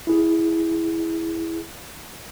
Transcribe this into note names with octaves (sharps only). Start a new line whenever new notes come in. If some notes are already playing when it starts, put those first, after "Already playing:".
E4 G#4